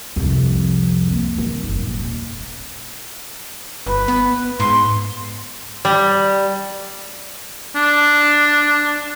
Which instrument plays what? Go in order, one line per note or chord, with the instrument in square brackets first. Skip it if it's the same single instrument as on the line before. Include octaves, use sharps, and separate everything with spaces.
[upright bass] C2 F2
A#3
D#3
G1 D#4
F#2 A#2
D#1
[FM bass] G1 [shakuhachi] B4
[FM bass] B3
[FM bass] G#2 [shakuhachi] C6
[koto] G3
[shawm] D4